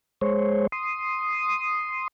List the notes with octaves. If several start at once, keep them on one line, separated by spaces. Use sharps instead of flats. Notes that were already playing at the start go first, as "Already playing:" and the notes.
G#3 C5 C#5
C6 D#6